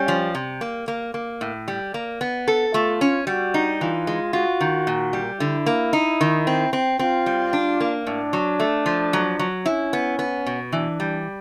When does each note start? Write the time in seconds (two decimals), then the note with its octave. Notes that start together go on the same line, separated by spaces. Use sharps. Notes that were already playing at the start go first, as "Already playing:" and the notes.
Already playing: G3 C#4
0.08 F3
0.35 C3
0.61 A#3
0.88 A#3
1.14 A#3
1.41 A2
1.68 G3
1.94 A#3
2.21 B3
2.48 A4
2.74 A3 F4
3.01 C#4
3.27 G3 F#4
3.54 D#4
3.81 E3 F4
4.07 G#3
4.33 F4 F#4
4.60 D#3
4.87 A#2
5.13 G3
5.40 D3 E4
5.66 A#3
5.93 D#4
6.21 D#3
6.47 C4
6.73 C4
6.99 C4 F4
7.26 G3
7.53 D4
7.80 A#3
8.07 A2 D4
8.33 F#3
8.60 A3
8.86 F3
9.13 F#3
9.39 F#3
9.66 C#4 E4
9.93 B3
10.19 B3
10.46 B2
10.72 E3 D4
11.00 G3